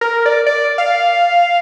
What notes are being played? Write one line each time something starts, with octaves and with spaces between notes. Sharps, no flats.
A#4
D5
D5
F5